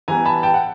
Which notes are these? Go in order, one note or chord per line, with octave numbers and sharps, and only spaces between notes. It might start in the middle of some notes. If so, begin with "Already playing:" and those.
E3 G3 B3 G#5 A#5
A5 B5
G5 A5
F#5